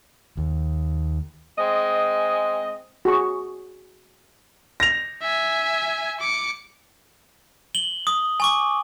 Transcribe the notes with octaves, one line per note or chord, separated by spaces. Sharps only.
D#2
G#3 C4 D#5
F#4 G#4 C#6
A#6 F7
E5 G#5
D6 C#7
F#7 G7
D#6
G#5 C#6 D6